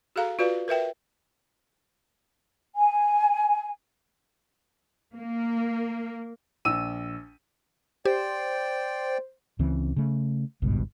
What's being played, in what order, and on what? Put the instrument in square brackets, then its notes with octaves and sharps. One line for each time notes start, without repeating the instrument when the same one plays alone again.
[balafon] F#4 G#4 A4 F5 A#5
F4 F#4 B4 D5 F5
A#4 B4 E5 G5
[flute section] G#5
[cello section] A#3
[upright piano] A#1 E6 D#7
[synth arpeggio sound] G4 [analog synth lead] C5 [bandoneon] D5 G5
[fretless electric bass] C#2 C#3 E3 C4
C#3 A3
G#1 C#2 G2 B2